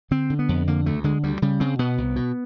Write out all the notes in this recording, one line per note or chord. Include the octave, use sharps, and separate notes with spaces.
D3 C4
D3
B3
F2
D3 A#3
D2 A3
D3 G#3
D2 G3
C#3 G3
C#3 C4
B2 B3
C2
B2